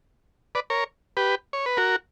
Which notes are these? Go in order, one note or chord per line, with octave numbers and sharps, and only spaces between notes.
B4 D5
A#4 C#5
G4 B4
C#5
B4
F#4 A#4